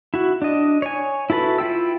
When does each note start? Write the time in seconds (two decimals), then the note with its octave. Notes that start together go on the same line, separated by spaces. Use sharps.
0.14 E4 F#4
0.42 D4 D#5
0.82 C#5 G#5
1.30 E4 F#4 A4 B4 B5
1.58 E4 F4 G5 E6